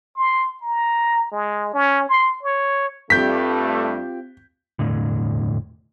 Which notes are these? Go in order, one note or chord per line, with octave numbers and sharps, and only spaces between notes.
C6
A#5
G#3
C#4
C6
C#5
G2 A3 C4 F4 G4 G6 B6
E1 A2 D3